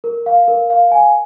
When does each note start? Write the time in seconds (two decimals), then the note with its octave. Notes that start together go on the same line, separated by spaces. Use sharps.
0.04 A#4
0.26 F5
0.48 A#4
0.70 F5
0.92 G#5